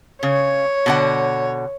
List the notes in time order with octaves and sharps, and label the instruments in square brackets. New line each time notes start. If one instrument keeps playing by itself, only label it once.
[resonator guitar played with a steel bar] C#3 [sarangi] C#5
[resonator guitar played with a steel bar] B2 D3 F#5